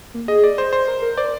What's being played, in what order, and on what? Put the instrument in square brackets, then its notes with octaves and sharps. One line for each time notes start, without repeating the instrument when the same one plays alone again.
[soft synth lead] A#3
[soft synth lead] G#4 [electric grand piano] D#5
[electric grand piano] D5
C5
C5
[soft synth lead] A#4
A#4
[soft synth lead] C5 [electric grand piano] D5